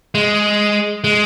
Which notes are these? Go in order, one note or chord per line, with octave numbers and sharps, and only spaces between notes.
G#3
G#3